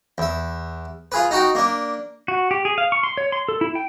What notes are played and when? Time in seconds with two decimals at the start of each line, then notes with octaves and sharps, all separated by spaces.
0.18 E2 E5
1.12 F4 G#4 B4
1.31 D#4 F#4 G5
1.55 A#3 D4
2.28 F#4
2.51 G4
2.65 G#4
2.78 F5
2.92 C#6
3.03 C6
3.17 C#5
3.32 C6
3.49 A4
3.61 E4
3.75 G5